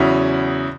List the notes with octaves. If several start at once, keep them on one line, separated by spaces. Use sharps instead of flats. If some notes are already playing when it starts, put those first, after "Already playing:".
Already playing: E2 C#3 F#3 C#4 E4